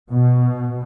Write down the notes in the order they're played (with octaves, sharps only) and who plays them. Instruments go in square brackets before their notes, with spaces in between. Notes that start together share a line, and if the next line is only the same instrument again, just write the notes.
[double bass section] B2